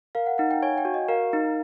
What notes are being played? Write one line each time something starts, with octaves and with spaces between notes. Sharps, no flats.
A#4 F5
F#5
D#4 F#5
G5
C#5 G#5
G5
F#4
D#5
A#4 F5
D#4